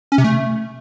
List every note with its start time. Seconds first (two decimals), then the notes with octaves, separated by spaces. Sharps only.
0.12 C#4
0.18 C3
0.24 A3